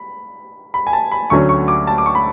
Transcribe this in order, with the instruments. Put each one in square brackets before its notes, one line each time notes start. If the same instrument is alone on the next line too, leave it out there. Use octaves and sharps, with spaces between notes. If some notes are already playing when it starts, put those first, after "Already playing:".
Already playing: [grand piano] B5
B5
G#5
A5
B5
D2 D3 F#3 A3 C#4 C#6
C#6
D6
A5
D6
C#6
B5